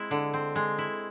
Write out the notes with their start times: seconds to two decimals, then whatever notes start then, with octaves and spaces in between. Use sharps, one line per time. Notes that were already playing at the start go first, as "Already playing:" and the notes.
Already playing: G#3 C4 E4
0.11 D3
0.34 C4
0.56 G#3
0.78 E4